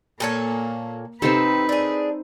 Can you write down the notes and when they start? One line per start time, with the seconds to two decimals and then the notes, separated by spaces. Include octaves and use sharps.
0.20 A#2 A#3 A4 C#5
1.22 C3 C4 D#4 A4 B4
1.69 D4 G#4